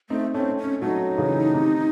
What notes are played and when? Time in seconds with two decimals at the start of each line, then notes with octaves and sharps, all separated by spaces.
0.10 A3 C4 D#4
0.34 A3 C4 C#4
0.58 C#4
0.82 F#3 A3 D#4
1.18 C#3 E3
1.54 C3 D#3